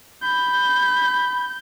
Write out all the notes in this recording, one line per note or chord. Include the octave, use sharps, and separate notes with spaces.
B5 G6